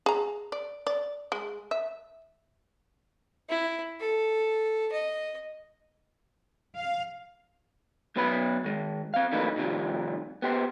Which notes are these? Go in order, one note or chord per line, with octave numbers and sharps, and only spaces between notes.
G#4 A#5
D5
D5
G#3
E5
E4
A4
D#5
F5
B1 F#3 B3 C#4 B4 B5
D#3 G#3
C4 F5
E3 F#3 A3 A#3 D#4 B4
A2 C3 D#3 F3 G3
B3 G4 C5